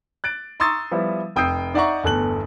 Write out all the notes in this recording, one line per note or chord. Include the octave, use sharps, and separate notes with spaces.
F#6 A6 D7
A#5 C6 C#6 D#6 E6 A6
F3 G3 B3 E4
F1 G5 D#6 E6 G6 C7
D#4 D5 E5 F#5 A#5 C#6
G1 E2 A3 A4 F#6 F#7